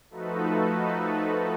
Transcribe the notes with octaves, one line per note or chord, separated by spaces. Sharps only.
F3 A3 D#4 F#4 A4 B4